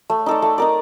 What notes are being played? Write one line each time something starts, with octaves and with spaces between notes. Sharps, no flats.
A3
D#4 A4 D5
A3
D#4 A#4 D5